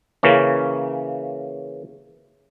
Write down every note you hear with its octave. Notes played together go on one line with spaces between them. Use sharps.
C#3 E3 A#3 C#4